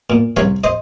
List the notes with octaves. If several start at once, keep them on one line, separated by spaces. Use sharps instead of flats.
A#2
C2 C#5 F5
C5 D#5